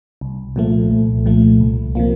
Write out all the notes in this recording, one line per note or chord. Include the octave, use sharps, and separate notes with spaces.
C2
A#2 F3 A3
C2
A#2 F3 A3
C2
C3 F3 A#3